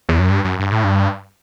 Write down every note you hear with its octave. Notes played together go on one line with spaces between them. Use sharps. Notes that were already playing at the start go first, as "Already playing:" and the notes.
E2
F#2
G2
F#2
G2
A2
G2